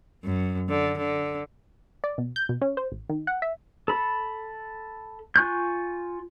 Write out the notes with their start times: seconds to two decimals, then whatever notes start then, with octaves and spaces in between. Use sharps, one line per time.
0.24 F#2
0.69 D3
0.98 D3
2.04 D5
2.18 B2
2.36 G6
2.49 B2
2.62 C#4
2.77 C5
2.92 A1
3.09 D#3
3.27 F#5
3.42 E5
3.88 A4 B5
5.36 F4 G#5 C#6 F#6 G6